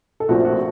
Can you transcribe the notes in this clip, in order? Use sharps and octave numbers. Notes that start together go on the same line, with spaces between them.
A4
A#1 A#2 A3 C4 F#4
F#4